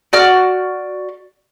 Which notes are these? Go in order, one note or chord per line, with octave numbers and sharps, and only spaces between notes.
F#4 D5 F6